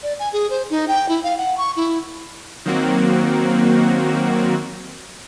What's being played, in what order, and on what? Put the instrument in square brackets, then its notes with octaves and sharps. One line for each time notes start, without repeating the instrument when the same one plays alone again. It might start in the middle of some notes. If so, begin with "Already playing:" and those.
[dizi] D5
G#5
G#4
C5
D#4
G5
E4
F5
F#5
C#6
E4
[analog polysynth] D#3 F#3 A#3 C4 F#4